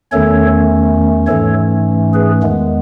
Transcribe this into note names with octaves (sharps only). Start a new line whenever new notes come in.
E2 D#3 A3 C#4 A4 C#5
G#2 E3 A3 C#4 A4 C#5
G#4 B4
E2 D#3 G#3 B3